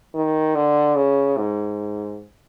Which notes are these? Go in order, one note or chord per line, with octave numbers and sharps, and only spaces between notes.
D#3
D3
C#3
G#2